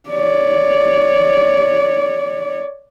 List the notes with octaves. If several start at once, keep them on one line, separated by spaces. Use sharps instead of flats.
C#5 D5